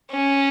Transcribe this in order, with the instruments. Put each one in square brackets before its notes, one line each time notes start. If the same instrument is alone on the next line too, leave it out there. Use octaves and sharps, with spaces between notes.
[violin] C#4